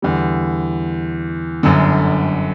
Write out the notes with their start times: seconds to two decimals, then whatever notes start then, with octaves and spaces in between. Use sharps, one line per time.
0.02 E2 D3 G3
1.63 G1 F#2 D3